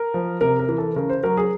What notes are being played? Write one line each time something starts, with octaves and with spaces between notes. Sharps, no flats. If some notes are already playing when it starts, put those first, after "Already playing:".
Already playing: A#4
F3
C3 A#4
A#4
E3
A4
C#3 A#4
C5
F#3 A#4
G#4